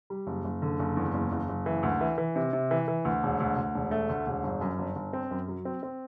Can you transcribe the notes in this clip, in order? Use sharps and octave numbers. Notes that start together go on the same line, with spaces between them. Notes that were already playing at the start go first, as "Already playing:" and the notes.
G3
F#1
F#1
D3
F#1
E2
F#1
F#1
F#1
E3
D2
E3
E3
C3
C3
E3
E3
D2
E1
D2
D2
E1
A3
D2
E1
G1
F#2
G1
G1
C4
F#2
F#3
C4
C4